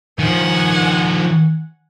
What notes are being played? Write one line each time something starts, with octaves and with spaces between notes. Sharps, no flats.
D#3 F3 F#5 G#5